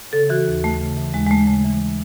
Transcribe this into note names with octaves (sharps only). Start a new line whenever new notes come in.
C#3 A4
E3 F#4
D#2
D#2 A3
C#3
E3
D#2 G#3
G#3
D#2 A3
C#3 A3
E3